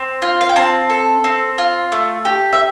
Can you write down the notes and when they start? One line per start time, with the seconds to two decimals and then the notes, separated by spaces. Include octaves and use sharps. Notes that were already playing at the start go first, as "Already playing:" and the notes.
Already playing: C4
0.22 F4
0.41 F5
0.49 G5
0.56 C4 A5
0.90 A4
1.24 C4
1.58 F4
1.92 A3
2.25 G4
2.53 E5